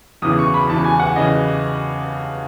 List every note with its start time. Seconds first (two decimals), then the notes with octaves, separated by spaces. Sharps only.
0.22 E2 C#3 E3 D#6
0.39 C#6
0.54 B5
0.69 E2 C#3 E3 A5
0.84 G#5
0.99 F#5
1.16 C#3 E3 D#5